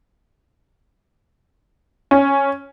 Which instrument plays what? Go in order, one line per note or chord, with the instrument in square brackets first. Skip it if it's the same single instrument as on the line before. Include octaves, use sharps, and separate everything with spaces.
[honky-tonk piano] C#4